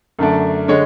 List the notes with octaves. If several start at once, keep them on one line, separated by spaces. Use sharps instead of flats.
F#2 D3 A3 D4
D3 G#3 C#5